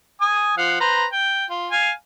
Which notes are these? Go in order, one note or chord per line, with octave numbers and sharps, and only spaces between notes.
G#5 D#6
F3 F5 F#5
B4 C5 A#5
G5
F4
F5 G#5